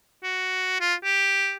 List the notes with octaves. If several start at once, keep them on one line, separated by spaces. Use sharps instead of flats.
F#4
F4
G4